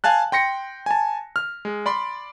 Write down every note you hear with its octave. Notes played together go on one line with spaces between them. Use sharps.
F5 G#5 A5 F#6
G5 C6 A#6 C#7
G#5 A5
F6
G#3
D5 B5 C6